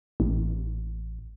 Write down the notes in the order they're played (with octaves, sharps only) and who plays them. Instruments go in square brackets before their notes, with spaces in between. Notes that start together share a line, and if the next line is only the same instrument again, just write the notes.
[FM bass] A1